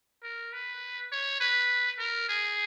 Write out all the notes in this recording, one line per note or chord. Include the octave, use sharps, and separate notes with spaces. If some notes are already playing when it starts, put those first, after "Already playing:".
A#4
B4
C#5
B4
A#4
G#4